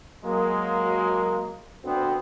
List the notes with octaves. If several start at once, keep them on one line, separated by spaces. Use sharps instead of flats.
F#3 G#3 A#3
D2 B3 C4